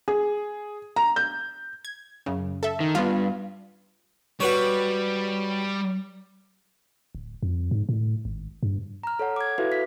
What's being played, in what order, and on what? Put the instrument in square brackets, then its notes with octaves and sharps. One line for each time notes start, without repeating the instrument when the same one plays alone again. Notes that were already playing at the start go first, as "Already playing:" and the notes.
[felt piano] G#4
A#5
G6
[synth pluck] G#6
F#2 C#3
A4 E5
[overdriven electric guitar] D#3
[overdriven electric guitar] G2 [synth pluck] B3 F4
[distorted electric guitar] G3 [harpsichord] F#4 B4 C#5
[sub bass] D1
F2
G#2
A2
G#1
G2
[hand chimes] A#5 F6
A4 C#5 F#5
D6 G#6
E4 F#4 A4 B4 E5 F5
B6